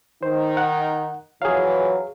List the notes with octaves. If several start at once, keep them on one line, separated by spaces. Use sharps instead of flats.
D#3 D#4 C5
F#5
F2 E3 F#3 G#4 F5